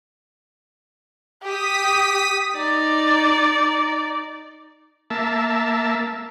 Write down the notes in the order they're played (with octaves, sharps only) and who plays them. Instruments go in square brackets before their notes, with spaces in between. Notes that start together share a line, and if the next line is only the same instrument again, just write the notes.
[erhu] G4 [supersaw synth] D#6 B6
[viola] D#4 D5
[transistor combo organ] A#3 E5 A5